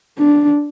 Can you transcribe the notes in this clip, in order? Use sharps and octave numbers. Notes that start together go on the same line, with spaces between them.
D4